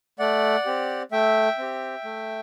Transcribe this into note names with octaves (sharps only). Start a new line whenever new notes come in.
A3 D5 F#5
C4 G4
A3 E5 G5
C4 G4
A3